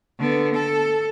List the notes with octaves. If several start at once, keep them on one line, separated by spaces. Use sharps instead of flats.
D3 B3
A4